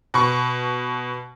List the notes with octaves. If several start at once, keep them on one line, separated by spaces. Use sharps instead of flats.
B2 B5 C#6